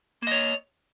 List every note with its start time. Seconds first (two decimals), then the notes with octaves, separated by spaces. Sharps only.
0.22 A#3
0.27 D#5
0.32 C#5